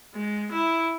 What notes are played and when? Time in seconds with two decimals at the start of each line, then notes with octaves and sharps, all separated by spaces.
0.14 G#3
0.51 E4